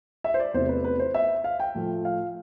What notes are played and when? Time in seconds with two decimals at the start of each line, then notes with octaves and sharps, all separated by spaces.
0.24 E5
0.34 C5
0.39 D5
0.54 E2 C3 E3 A3 C5
0.69 B4
0.84 B4
0.99 C5
1.14 E5
1.44 F5
1.60 G5
1.74 A2 F3 A3
2.05 F5